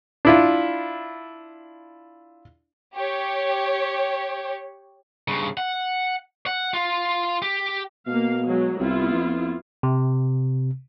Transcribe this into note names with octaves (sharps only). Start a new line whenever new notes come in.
D4 E4 F4
G4 C#5
G2 C#3
F#5
F#5
F4
G4
B2 A#3 F5
F#3 G#3
C2 B3 E4 F4
F2
C3